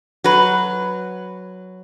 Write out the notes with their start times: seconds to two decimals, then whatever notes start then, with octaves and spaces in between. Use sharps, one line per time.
0.24 F#3 B4